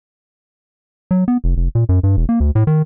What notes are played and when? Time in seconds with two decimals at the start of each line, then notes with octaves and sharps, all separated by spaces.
1.11 F#3
1.28 B3
1.44 F1
1.57 F1
1.75 A#2
1.89 F#2
2.03 G2
2.17 E1
2.29 A#3
2.40 D2
2.55 A2
2.67 D#3